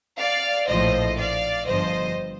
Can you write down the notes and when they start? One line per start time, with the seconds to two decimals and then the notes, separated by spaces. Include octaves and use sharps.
0.18 D5 F5
0.68 A#1 A2 F3 C5 D#5
1.18 D5 F5
1.67 G1 G2 F3 C5 D#5